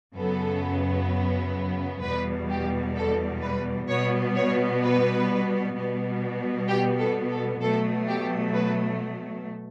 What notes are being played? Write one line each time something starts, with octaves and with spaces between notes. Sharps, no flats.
F#2 C#3 F#3 B3 A4
E2 B2 G3 B4
G4
A4
B4
B2 G3 B3 C#5
C#5
B4
B2 G3 B3
G4
A4
A4
B2 F#3 A3 A4
G4
B4